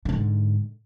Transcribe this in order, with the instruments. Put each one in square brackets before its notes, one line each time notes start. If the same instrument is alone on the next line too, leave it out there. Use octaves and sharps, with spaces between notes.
[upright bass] G#2 D3